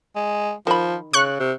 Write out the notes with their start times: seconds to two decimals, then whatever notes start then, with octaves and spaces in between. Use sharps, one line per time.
0.16 G#3
0.67 D#3 F3 B5
1.13 C#3 C#6 F#6
1.40 C3